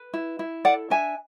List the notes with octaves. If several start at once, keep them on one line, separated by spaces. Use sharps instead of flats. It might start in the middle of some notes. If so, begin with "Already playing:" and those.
Already playing: B4
E4
E4
A4 D5 F#5
D4 E5 G#5